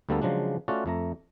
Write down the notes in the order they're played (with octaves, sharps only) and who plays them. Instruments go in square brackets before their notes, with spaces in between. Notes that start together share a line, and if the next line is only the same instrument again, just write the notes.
[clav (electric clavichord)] D2 D3 G3 A#3 B3 A4
C#3 F3 F#3 G#3 D4
A3 C#4 F4 F#4 D5
F2 A3 A#5